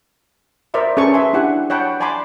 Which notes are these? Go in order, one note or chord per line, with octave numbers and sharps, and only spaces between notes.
A#4 C5 D5 E5 B5
C#4 G#4 A4 B4 G#5 C#6
E5 G#5 C6
D4 E4 G4 F#5 G#5
C#5 F#5 G5 A5 B5
D5 G#5 A5 B5 C6 D6